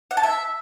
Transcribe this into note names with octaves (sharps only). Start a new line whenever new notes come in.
F#5
A5
E5